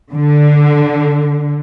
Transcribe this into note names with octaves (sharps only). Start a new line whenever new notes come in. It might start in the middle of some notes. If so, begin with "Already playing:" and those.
D3